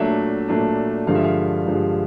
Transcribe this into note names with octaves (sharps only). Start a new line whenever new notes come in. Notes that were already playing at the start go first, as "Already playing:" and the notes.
Already playing: A#2 F#3 A3 D4 E5
A#2 F#3 A3 D4
G2 D3 F3 G#3 F5
E5
F5
G2 D3 F3 G#3